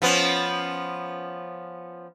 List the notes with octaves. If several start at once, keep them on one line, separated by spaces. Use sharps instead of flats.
F3 B3 C#4